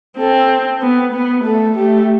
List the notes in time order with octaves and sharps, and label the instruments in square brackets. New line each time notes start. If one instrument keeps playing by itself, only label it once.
[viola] C4 [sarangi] A4
[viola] B3
B3
[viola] A3 [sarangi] A4
[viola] A3 [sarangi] G4